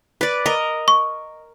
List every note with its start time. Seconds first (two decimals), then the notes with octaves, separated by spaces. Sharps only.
0.21 B4 D5
0.46 A#4 D#5
0.88 C#6